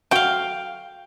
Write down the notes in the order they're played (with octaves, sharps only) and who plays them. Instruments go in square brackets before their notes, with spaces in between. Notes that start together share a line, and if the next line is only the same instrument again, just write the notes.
[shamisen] F#3 F#4 [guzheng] F5 G5